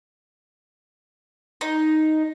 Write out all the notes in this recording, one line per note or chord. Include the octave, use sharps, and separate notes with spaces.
D#4